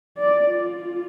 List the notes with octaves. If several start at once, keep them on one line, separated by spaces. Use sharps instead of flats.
D5
F4